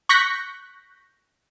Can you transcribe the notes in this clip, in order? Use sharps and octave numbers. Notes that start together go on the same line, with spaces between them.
C#6 F#6 G6 A#6 B6